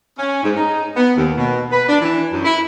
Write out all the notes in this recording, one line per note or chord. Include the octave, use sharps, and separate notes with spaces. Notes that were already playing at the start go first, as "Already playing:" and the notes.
C#4
G#2
D#4
B3
D#2
B2
B4
D4
E3
F#2
E4